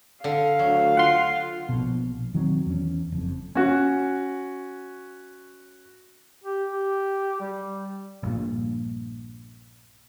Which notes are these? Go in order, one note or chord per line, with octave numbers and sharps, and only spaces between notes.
D3 F5
D2 F#3
F4 F#5 C6
A#1 B2
E1 D#3 F#3 C4
E2 C#4
F#1 F2
C#4 F#4
G4
G4
G3
A#1 G2 A#2